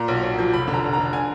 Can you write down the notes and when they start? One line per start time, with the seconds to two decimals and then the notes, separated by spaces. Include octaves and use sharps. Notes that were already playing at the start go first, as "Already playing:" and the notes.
Already playing: A#2 A#5
0.08 B1
0.23 B1
0.38 F3
0.53 F1 B5
0.68 D3
0.74 A#5
0.84 F1
0.93 A#5
0.98 D3
1.13 G#5